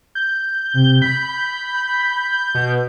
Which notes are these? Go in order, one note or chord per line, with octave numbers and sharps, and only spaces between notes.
G6
C3
B5 G6
B2